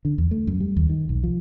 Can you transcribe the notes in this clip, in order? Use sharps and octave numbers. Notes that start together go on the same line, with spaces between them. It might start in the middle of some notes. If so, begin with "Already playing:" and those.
D3
E2
A3
F#2
G3
D#2
D#3
B1
F3